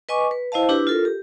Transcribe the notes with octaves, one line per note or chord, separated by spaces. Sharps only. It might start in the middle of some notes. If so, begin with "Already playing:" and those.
B4 D#5 G#5 C#6 D6
B4
E4 C5 D#5 F5 A5
D4 E4 F#4 G4 B4
F4 A4 A#4
G4